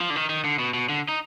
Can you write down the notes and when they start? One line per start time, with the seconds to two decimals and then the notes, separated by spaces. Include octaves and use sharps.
0.01 F3
0.10 D3
0.16 D#3
0.30 D#3
0.45 D3
0.59 B2
0.74 B2
0.89 D3
1.09 D#4